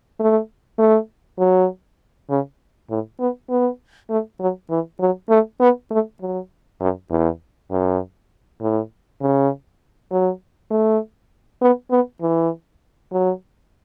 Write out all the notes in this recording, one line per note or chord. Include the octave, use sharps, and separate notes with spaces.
A3
A3
F#3
C#3
A2
B3
B3
A3
F#3
E3
F#3
A3
B3
A3
F#3
F#2
E2
F#2
A2
C#3
F#3
A3
B3
B3
E3
F#3